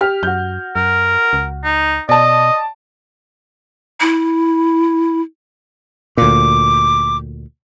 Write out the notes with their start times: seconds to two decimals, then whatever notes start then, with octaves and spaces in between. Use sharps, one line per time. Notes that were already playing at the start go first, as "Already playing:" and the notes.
0.01 G4 F6
0.23 F#2 F#4 G6
0.76 F#2 A#4
1.33 C#2
1.64 D#4
2.09 B2 D5 D#5 A5
4.00 E4
6.17 D2 A#2 D6